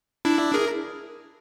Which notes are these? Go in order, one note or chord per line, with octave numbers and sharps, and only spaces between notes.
D4 E4
G#4 A#4